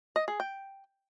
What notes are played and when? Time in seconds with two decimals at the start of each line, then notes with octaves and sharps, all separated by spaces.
0.16 D#5
0.28 G#4
0.40 G5